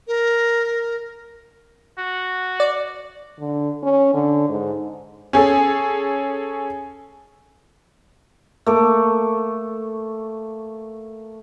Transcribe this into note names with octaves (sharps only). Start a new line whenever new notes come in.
A#4
F#4
D5
D3
C#4
D3
G#2
C#4 G#4 A4
A3 A#3 D6